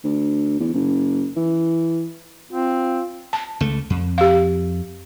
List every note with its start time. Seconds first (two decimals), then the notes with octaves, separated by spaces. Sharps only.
0.04 D2
0.60 E2
0.74 F#1
1.36 E3
2.51 C4 F4
3.33 A5
3.60 C#2 A3
3.90 F2
4.18 G4 F5